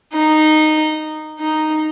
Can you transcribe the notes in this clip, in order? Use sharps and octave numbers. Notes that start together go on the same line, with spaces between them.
D#4
D#4